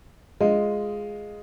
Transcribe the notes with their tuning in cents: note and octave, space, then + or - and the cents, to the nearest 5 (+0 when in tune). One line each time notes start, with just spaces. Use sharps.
G#3 +0 F4 +0 D#5 +0